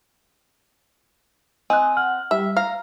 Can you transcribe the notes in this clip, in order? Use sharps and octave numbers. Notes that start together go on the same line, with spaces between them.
C4 D#5 G#5 F#6
F#5 F6
G3 E5
F5 A#5